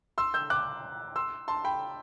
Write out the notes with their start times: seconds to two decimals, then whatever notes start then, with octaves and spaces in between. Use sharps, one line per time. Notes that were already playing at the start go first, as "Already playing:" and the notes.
0.18 C6 E6
0.34 E6 G6
0.50 D6 F#6
1.16 C6 E6
1.48 A5 C6
1.64 G5 B5